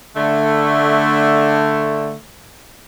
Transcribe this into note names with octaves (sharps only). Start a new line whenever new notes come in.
D3 A3